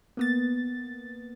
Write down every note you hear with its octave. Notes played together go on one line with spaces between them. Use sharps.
A#3 B3 A6